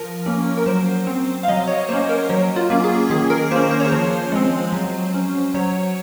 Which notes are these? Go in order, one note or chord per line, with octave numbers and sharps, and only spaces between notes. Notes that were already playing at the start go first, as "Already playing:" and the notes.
Already playing: F3 A#4
A#3 C#4
A#4
F#3 C5
C4
F5
F#3 D#5
C#5
A#3 C#4 C5
A#4
F#3
F4
A#3 C#4
G#4
D#3 G#4
A#4
A#3 C#4 C5
C5
C#5
F3 C5
G#3 C4
F#3
C#4
F#3 C#5